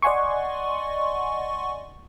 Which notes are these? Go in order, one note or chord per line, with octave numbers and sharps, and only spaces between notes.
D5 D#5 F#5 G#5 C6 C#6